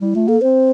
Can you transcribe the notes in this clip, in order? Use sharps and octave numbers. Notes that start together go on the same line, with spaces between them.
G3 E4
A3 F4
A#3 A4
C4 C5